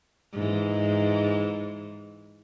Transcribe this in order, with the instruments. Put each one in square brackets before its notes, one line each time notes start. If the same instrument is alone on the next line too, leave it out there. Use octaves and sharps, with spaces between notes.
[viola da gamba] G#2 E3